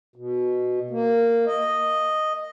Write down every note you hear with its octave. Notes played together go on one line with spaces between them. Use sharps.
B2
A#3
D#5